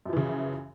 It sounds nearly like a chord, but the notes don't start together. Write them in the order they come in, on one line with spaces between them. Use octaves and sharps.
F#2 F3 E3 C#3